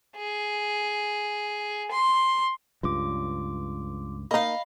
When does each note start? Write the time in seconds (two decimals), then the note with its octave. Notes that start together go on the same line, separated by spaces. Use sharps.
0.16 G#4
1.92 C6
2.83 C#2 G2 F4 D6
4.31 A#3 D#4 D#5 F5 B5